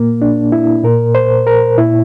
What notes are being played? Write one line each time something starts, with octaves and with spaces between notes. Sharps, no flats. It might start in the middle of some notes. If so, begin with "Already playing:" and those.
Already playing: A#2 A#3
D4
E4
A#2 A#4
C5
A#4
A#2 E4